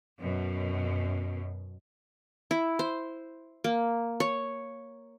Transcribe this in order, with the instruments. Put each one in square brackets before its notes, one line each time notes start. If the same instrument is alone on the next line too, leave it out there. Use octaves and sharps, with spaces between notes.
[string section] F#2 B2
[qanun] E4
C5
A#3
C#5